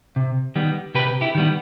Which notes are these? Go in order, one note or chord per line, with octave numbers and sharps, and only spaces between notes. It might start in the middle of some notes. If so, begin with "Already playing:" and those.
C3
D#3 G3 B3
C3 G4 B4
E4 G4
D#3 G3 B3